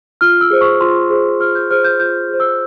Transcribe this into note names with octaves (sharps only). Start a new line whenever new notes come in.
F4 F6
E6
G#4 C5
C#6
F4 C6
G#4 C5
F4 F6
G6
G#4 C5 F6
G6
F4 G6
G#4 C5
E6